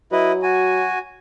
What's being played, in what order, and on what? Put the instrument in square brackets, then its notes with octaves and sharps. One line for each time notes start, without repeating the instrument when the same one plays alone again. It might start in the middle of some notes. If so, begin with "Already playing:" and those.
[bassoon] F#3 [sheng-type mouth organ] E4 B4 D#5
[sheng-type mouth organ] F#4 G#5